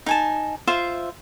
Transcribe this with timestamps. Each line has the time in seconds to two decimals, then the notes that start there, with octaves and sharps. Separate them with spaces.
0.06 D#4 G#5 A5
0.67 F4 C5 E5